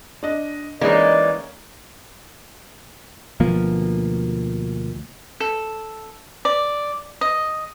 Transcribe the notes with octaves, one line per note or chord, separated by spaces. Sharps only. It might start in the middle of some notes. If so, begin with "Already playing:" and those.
D4 D#5
E3 G#3 A#3 C#4 D#4 D5
D2 B2 F3 A#3
A4
D5
D#5